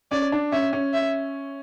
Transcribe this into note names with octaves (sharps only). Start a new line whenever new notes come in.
C#4 D5
D4
C#4 E5
C#4
E5